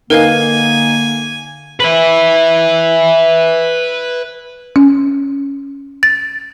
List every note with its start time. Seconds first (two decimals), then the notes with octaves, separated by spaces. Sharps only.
0.10 D3 A#3 D#4 A#4 B4 F5 G#5
1.80 B4 E5
4.76 C#4
6.03 A6